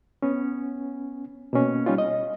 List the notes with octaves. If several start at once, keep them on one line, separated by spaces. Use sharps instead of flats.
B3 C#4
B2 A#3 C#4
G3 C#4 D#4 F4
D#5